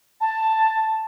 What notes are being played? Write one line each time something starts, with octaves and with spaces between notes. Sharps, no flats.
A5